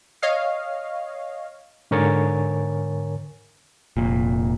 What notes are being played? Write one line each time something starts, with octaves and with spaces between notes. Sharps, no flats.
C#5 D#5 F5
G#2 D3 A#4 C#5 G#5 A6
F1 A#2